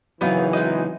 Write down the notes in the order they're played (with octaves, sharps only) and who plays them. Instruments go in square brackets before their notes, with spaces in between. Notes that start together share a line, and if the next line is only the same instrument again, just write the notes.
[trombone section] G#1 E3 [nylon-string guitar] C#3 F#3 [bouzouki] B3 D#4 F5
[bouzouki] G#3 D#4